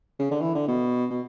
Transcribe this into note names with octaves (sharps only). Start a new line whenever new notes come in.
C#3
D3
E3
D3
B2
B2